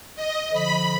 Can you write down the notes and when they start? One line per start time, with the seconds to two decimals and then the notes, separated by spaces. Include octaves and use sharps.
0.16 D#5
0.53 D3 F3 B5